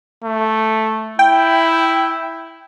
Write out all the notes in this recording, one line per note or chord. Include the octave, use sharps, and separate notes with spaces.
A3
E4 G5